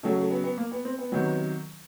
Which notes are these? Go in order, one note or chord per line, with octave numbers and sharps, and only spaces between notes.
C#3 F#3 A3
A3
B3
B3
A#3
B3
C4
B3
C3 D#3 F#3